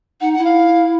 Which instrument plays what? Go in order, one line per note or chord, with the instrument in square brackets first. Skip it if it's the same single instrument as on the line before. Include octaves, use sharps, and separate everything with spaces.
[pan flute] D#4 [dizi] F#5
[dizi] F#5
[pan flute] E4
[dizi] F5